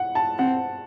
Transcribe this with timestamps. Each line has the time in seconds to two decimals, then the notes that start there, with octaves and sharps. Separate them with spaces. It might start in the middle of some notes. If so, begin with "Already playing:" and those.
Already playing: F#5
0.15 A5
0.38 C4 F#5